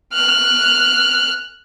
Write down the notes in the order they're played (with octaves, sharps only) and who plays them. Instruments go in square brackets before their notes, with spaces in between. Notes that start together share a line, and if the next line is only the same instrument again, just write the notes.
[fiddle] F6 F#6